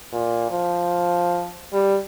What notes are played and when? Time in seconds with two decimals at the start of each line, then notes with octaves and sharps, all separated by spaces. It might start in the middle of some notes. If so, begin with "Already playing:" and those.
0.12 A#2
0.50 F3
1.73 G3